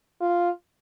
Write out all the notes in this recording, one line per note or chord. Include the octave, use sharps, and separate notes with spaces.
F4